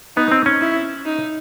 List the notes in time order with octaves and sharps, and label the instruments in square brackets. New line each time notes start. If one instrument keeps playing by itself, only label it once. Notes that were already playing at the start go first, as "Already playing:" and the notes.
[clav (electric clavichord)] B3 [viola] D#4
[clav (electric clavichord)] C4
C#4
[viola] E4
D#4